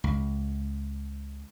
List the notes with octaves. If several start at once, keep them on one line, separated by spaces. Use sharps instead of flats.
C#2